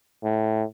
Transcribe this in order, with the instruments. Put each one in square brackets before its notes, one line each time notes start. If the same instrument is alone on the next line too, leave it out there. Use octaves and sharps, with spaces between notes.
[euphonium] A2